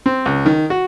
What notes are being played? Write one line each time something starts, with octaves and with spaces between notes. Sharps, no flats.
C4
C#2
D#3
F#4